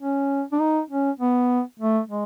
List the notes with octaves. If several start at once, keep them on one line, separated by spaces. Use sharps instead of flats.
C#4
D4
D#4
C#4
B3
A3
G#3